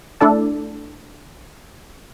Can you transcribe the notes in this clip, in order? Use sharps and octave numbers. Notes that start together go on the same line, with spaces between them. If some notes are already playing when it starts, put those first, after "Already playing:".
A3 D4 E4 A4 D5 A5